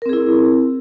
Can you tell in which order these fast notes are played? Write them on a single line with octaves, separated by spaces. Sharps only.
A#4 C4 G#4 E4